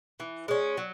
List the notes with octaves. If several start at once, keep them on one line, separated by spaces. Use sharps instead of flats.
E3
G#3 C#4
F#3